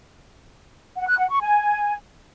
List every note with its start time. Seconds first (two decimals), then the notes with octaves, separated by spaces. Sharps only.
0.96 F#5
1.07 F#6
1.18 F#5
1.30 C#6
1.41 G#5